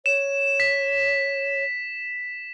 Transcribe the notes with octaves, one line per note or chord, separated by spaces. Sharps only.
C#5 E7
B6